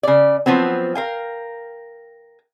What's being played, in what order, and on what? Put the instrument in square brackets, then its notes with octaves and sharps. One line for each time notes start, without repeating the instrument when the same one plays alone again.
[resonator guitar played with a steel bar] C#3 D5
F3 F#3 B3 C4
A#4 F5 G5